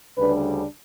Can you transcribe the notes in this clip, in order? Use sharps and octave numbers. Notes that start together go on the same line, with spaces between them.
D2 C#3 G3 D4 B4